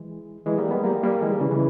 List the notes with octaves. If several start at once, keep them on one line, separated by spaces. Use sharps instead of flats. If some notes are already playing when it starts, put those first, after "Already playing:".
Already playing: E3 G#3
E3 G#3
G3 A#3
G#3 B3
G3 A#3
G3 A#3
E3 G#3
D#3 G3
C#3 E3
C#3 E3